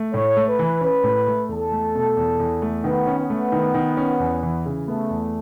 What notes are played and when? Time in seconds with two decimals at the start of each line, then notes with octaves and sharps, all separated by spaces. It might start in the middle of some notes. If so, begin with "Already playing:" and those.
Already playing: A3
0.13 A2 C#5
0.37 A3
0.48 B4
0.59 E3
0.81 C#4 B4
1.04 A2
1.27 A3
1.49 E2 A4
1.72 A3
1.95 B2
2.17 E2
2.39 E2
2.62 A3
2.84 D#3 B3
3.07 C#4
3.18 B3
3.30 A3
3.52 D#3
3.74 D#3
3.97 C#4
4.20 E2
4.43 E3
4.66 C#3
4.88 A3 B3
5.10 E2